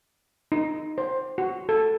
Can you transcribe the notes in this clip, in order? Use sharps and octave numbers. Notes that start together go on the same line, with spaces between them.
D#4
C5
F#4
A4